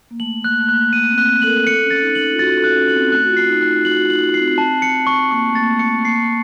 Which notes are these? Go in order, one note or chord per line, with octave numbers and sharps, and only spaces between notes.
A#3
A3 F#7
A#3 F#6
A3
A#3 F#6
A#3 D#7
C4
F#6
A4 F#7
A#4
A4 C#7
C#4
A6
D#4
F#7
F4
F#4 A6
A4
F#6
C#4
F#7
C4
A3 F#6
F#4
F4
C7
D#4
F#6
F4
F#4 F#7
F#4
F4
F#7
D#4
F4
C7
C4
A5
C#7
C#6
A#3 C#6
A3
A#3 A6
A3
C#7
A#3
A#3 C7